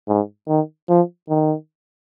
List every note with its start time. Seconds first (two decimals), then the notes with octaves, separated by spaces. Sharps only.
0.08 G#2
0.48 D#3
0.89 F3
1.30 D#3